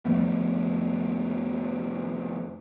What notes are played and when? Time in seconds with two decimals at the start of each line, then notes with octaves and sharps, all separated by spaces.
0.05 F2 F3 A3 B3